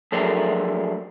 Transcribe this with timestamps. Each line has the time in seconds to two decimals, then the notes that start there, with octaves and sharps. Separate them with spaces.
0.12 F3 F#3 A3 D4 G#4 A#4